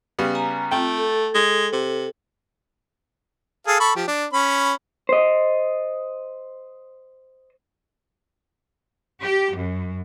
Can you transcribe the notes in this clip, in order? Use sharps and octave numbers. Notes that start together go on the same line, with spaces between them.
C#3 G3 B3
G#5 A#5
A3 C4 F4 G5
A4
G#3
C3
G#4 A4 F5
A4 B5 C#6
F3 G4
D4
C#4 B5
C5 D#5
G4
F#2